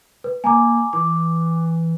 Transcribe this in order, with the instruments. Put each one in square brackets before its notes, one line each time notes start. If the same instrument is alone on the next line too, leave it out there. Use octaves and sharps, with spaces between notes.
[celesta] B4
[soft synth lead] A#3 [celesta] G#5 A#5 D6
[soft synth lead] E3 [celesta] D6